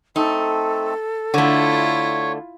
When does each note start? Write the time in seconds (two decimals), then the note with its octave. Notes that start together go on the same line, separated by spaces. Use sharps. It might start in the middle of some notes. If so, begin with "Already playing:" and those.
0.16 A3 C4 D#4 A4
1.34 D3 A3 E4 F4 C#5